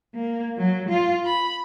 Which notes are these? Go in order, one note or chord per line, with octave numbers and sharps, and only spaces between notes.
A#3
F#3
F4
B5